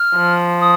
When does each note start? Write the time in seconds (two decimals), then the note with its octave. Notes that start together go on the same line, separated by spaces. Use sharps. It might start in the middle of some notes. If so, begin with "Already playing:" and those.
Already playing: F6
0.16 F3
0.60 D#6